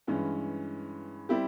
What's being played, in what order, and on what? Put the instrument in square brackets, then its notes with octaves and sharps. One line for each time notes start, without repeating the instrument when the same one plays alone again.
[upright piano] G2 E3 G#3 C#4
G3 C4 E4 G4